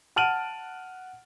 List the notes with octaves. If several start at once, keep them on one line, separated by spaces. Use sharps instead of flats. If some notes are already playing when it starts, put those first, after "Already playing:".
F#5 A5 F6 D7 D#7 F#7